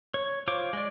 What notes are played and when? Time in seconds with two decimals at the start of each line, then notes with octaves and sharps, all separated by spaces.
0.14 C#5
0.48 F4 C5 C#5 D6
0.73 G#3 D5